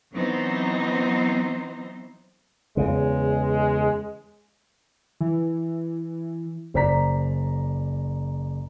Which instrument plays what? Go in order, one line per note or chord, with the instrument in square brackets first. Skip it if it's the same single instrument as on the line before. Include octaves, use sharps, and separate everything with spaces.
[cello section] E3 F#3 B3 C4 D#4 C5
[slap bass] E2 C#3 [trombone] G#3
[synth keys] E3
[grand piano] F#1 C5 D5 A#5 B6